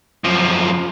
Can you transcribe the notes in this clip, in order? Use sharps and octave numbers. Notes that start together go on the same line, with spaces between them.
F#2 F3